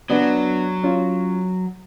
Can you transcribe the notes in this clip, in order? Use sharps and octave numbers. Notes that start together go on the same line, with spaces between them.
F#3 B3 D4
C#4 F4